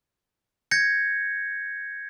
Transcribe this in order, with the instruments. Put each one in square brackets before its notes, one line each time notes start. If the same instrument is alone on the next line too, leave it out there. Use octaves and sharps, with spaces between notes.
[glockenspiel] G6 G#6 A#6 C#7